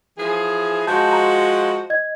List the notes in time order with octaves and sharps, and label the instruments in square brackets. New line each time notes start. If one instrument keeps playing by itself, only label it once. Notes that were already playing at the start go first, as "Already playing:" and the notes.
[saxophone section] E3 F3 G#4
[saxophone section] F3 G#3 F#4 [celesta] A5 G6
[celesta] A#5
D#5 G#6